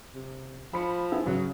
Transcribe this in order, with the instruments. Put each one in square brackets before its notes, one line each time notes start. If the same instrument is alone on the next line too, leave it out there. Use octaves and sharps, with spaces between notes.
[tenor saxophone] C3
[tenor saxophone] F3 [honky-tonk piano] B5 C#7
[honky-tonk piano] B3 E4 G#4
[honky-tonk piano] C#3 [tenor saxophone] F#3